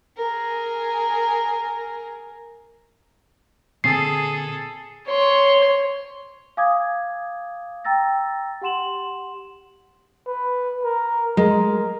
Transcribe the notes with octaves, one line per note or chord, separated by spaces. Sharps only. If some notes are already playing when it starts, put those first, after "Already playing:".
G#4 A#4
A#2 D3 C4 G#4 A4 C7
C#5 C6
F5 G#5 D6 D#6 G#6
G5 A#5 E6 A6 A#6
G4 F#5 C6 E7 F#7
B4
A#4
G#3 A#4